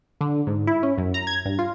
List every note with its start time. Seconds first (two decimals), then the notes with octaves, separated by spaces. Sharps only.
0.21 D3
0.47 G#2
0.67 E4
0.83 C#4
0.98 F#2
1.14 A#5
1.27 G#6
1.45 G2
1.59 F4